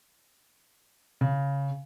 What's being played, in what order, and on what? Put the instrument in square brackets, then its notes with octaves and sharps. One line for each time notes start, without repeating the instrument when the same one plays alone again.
[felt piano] C#3